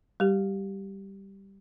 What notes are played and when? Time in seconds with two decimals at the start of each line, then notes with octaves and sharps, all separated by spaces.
0.20 G3 G4